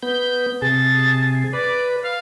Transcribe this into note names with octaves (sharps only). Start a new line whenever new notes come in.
B3 G6
C3 G#4 A5
B4 D5
F5